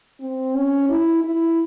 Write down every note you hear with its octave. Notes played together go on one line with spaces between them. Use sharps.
C4
C#4
E4
E4